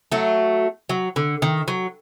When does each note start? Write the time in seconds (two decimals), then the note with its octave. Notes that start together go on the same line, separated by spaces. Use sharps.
0.12 F#3 A3
0.89 F#3
1.16 D3
1.42 D#3
1.68 F#3